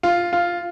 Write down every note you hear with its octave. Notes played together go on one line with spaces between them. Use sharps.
F4
F4